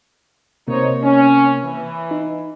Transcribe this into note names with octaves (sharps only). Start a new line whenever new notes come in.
C3 A#3 D#4 C5 C#5
C#4
E3
D#4